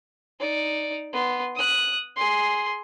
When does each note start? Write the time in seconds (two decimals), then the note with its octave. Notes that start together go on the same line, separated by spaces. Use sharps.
0.39 D#4 D5
1.13 B3 C6
1.55 D#6 F#6
2.16 G#4 C6